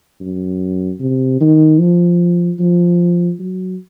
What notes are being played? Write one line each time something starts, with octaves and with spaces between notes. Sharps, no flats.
F#2
C3
D#3
F3
F3
F#3